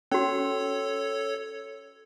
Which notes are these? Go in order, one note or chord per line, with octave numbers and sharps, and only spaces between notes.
C#4 F#4 A4 C#5